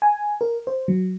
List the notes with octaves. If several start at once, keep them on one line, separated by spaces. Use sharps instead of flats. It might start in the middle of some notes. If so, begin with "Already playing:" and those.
G#5
A#4
C5
F#3